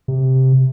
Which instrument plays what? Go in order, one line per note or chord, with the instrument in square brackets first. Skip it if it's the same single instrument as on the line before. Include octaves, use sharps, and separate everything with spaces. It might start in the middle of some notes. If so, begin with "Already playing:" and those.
[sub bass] C3